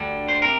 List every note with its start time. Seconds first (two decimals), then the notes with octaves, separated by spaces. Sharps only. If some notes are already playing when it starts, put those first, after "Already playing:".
Already playing: D2 D3 G3
0.28 C5
0.42 C3 A#4